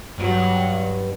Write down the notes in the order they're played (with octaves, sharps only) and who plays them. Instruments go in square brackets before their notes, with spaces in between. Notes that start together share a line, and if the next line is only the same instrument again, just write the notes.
[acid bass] G2 [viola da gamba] F#3